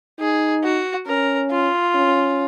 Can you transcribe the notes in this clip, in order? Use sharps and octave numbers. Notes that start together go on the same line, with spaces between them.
D#4 G#4
F#4
C#4 A#4
F4
C#4